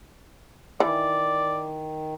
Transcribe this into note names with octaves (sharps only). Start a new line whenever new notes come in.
D#3 E3 D5